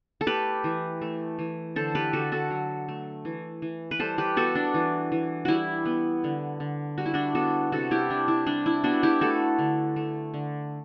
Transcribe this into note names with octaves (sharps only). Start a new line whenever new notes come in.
A4
A3 G4 B4
E3
A3
E3
D3 A4 C5
G4 B4
D3 F#4 A4
F#4 A4
F#3
A3
E3
E3
B4
G3 A4 C5
G4 B4
B3 F#4 A4
D4
E3
E3
G3 E4 F#4
B3
D3
D3
G3 F#4
E4
D4 F#4
B3 F#4 A4
C3 F#4 A4
E4 G4
C3 D4
E4
G3 D4
E4
B3 D4 F#4
E4 G4
A3 F#4 A4
D3
A3
D3